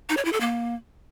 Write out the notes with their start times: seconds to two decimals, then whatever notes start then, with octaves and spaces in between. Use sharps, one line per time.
0.09 D#4
0.17 C#5
0.25 E4
0.33 A4
0.40 A#3